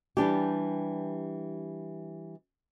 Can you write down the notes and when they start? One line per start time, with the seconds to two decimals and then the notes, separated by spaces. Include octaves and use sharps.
0.17 E3 G3 D4 G4